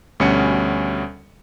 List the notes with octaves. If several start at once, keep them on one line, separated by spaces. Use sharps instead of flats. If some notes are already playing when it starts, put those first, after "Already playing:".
D2 B2 G3 C#4 C#7